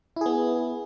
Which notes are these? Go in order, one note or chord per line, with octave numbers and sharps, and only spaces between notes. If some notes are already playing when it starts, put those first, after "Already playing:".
B3 E4 G#4